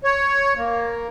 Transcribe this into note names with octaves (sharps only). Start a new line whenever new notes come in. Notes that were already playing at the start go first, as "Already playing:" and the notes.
C#5
A#3